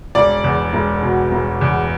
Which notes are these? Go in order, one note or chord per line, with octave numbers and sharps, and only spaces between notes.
E1 D5
E2
E1
B2
E1
E2